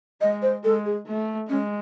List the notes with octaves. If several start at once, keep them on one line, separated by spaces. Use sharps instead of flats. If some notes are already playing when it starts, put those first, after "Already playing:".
G#3 D#5
C5
G#3 A4
G#4
A3
G#3 C#4